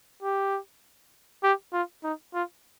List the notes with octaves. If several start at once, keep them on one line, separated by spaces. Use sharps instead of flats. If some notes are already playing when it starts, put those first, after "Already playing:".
G4
G4
F4
D#4
F4